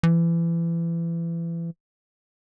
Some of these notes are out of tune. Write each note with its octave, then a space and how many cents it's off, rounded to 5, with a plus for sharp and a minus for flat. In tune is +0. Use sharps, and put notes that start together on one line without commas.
E3 +30